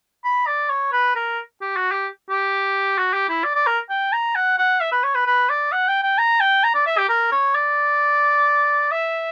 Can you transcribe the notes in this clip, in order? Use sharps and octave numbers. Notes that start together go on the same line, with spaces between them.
B5
D5
C#5
B4
A#4
G4
F#4
G4
G4
F#4
G4
E4
D5
D5
A#4
G5
A#5
F#5
F#5
E5
B4
C#5
B4
B4
D5
F#5
G5
G5
A#5
G5
A#5
D5
E5
G4
A#4
C#5
D5
E5